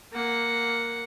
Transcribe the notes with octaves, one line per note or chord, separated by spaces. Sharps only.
A#3 F#5